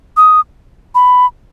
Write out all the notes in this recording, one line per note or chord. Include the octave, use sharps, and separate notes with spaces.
D#6
B5